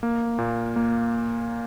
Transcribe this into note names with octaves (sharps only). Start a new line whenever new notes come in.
A#3
A#2
A#3